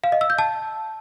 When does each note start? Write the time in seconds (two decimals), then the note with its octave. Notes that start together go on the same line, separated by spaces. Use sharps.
0.04 F5
0.12 D#5
0.21 E6
0.30 G6
0.38 A5